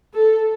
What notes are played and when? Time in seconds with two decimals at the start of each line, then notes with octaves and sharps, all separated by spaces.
0.14 A4